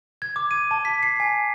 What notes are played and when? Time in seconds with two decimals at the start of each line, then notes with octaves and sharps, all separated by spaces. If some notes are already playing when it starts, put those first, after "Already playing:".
0.22 G#6
0.36 D6
0.51 D#7
0.71 A5
0.85 B6
1.03 C7
1.20 G#5